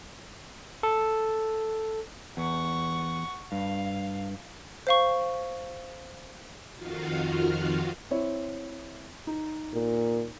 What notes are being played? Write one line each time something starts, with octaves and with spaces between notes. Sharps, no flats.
A4
E2 F#5 C#6
G2 F5
C5 F5 C#6
F2 D#3 F4 F#4 F5
C4 E4 C#5
D#4
A#2